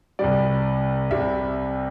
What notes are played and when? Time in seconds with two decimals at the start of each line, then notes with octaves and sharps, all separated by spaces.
0.19 C2 C3 G3 D5
1.11 C2 C3 G3 E5